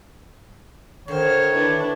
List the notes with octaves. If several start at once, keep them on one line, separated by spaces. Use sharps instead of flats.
D3 D#3 C5 C#5 F6
D4 E4 B4